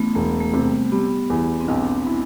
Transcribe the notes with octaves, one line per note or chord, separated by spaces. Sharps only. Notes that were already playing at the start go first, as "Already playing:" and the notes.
Already playing: A1 A3 B3
E1 A3
A3
C3
G3
G3 B3
E2
C4
B1 D4
E4